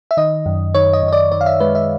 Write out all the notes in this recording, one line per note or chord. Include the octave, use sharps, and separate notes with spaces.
E5
D#3 D#5
F#2
D#3 C#5
D#5
F#2
D#5
D5
D#3 D5
F5
E5
G#3 B4
E5